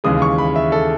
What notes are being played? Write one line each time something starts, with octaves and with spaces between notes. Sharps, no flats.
D#2 C#3 E3 G#3 D#6
C#6
B5
E5
A4